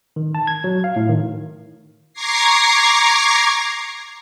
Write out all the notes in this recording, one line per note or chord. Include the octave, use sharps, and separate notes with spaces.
D#3
A5
G#6
F#3
F5
A2
D#3
A#5 C#6 D6 G#6 A#6 C7